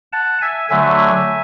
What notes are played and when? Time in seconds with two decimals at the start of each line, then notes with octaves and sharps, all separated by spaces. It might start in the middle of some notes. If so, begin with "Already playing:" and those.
0.13 F#5 A5
0.41 E5 G#5
0.70 D3 F#3 A3 E5 G#5